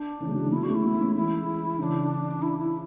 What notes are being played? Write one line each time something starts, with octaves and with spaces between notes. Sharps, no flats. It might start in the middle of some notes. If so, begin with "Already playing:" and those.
Already playing: D4
C#3 E3
G#3
D3 F#3
E3 G#3
G#3 B3 E4
A3 C#4 F#4
E4
G#3 B3
A3 C#4
E3 G#3 E4
C#3 E3 D4 E4
E4
E4